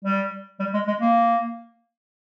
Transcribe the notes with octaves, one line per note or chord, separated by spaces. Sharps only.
G3
G3
G#3
G#3
A#3